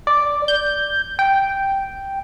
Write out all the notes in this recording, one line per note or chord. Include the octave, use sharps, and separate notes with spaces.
D5
G6
G5